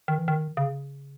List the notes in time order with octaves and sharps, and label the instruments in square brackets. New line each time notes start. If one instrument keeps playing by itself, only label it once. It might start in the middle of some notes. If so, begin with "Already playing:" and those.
[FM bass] D#3
E3
D#3
C#3